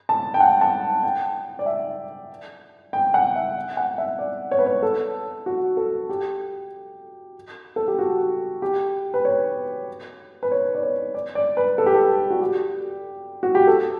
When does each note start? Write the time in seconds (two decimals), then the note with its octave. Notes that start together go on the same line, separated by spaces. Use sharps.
0.09 A5
0.34 G5
0.40 F#5
0.61 A5
1.03 G5
1.59 D5
1.66 E5
2.93 G5
3.14 F#5
3.36 E5
3.77 F#5
3.98 E5
4.19 D5
4.51 C#5
4.59 B4
4.66 C#5
4.83 A4
5.46 F#4
5.77 A4
6.09 G4
7.76 A4
7.88 G4
7.99 F#4
8.62 G4
9.14 B4
9.25 C#5
10.43 B4
10.52 C#5
10.75 D5
10.83 C#5
11.14 D5
11.35 D5
11.57 B4
11.78 A4
11.86 G4
11.95 A4
12.30 F#4
12.41 G4
13.43 F#4
13.55 G4
13.67 A4